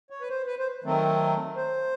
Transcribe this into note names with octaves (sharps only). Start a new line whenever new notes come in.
C#5
B4
C5
B4
C5
D#3 F#3 A3 C4
C5